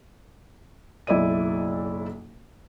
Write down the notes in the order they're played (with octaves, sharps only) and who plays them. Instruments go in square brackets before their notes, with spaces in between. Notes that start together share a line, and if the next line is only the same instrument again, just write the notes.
[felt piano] F#1 B1 E4 D5 D#5 D#7